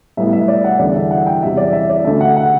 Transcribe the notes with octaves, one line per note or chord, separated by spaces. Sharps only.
A2 G3 B3 E5
E5
D5
F#5
E2 D3 G3 D5
E5
F#5
G5
E2 C3 G3 E5
D5
E5
D5
D2 D3 A3 E5
F#5
F#5